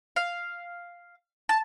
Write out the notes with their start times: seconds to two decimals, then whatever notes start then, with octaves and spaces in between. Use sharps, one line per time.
0.16 F5
1.49 A5